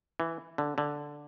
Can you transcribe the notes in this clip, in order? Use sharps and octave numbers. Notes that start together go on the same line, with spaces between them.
E3
D3
D3